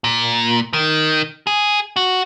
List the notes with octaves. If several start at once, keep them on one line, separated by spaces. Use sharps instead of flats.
A#2
D#3
G#4
F#4